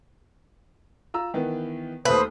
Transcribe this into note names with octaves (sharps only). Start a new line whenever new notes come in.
F4 A#5 E6
D#3 E3 B3
D#2 A3 B4 C5 E5 D#6